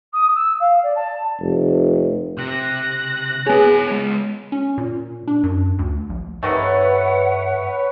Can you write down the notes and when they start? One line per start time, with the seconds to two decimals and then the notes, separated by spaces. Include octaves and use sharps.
0.13 D#6
0.35 E6
0.59 F5
0.83 D5
0.95 A5
1.41 F1
2.38 C3 F#6 A#6
3.47 B3 G#4 C#5 A5
3.88 G#3 C#5
4.52 C#4
4.78 A#2
5.27 D4
5.43 F#2
5.79 D2
6.10 A#1
6.43 G2 C3 D#3 A3 B4 C#5 F#5